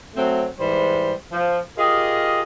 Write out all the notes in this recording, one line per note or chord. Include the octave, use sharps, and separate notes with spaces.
F#3 A3 C4
G#2 E3 G3 C5
F3
F4 G4 G#4 A#4 D#5